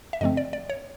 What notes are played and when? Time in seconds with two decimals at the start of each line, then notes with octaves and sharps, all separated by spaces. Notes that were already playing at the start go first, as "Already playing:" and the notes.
0.13 E5
0.21 G2 D3 F3 A3 C4 D#5
0.37 D5
0.53 D5
0.70 C#5